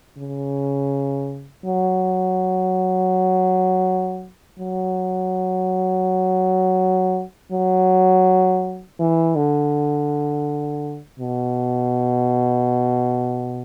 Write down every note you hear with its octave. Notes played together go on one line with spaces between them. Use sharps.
C#3
F#3
F#3
F#3
E3
D3
B2